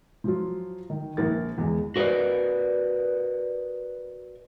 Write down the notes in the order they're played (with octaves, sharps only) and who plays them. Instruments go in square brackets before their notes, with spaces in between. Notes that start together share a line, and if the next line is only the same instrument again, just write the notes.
[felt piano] F3 F#3 F4
D#3
A#1 A#4 A6
E2 G#3
[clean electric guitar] F#4 A#4 B4 D5 D#5